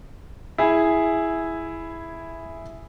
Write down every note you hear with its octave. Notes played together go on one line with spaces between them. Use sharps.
E4 G#4